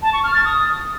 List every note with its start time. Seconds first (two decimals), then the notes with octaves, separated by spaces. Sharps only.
0.02 A5
0.13 C#6
0.24 F6
0.34 A6
0.45 D#6